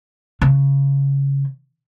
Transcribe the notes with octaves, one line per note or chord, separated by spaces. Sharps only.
C#3